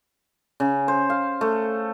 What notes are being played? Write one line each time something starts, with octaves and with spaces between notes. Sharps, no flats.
C#3
C5
F5
A3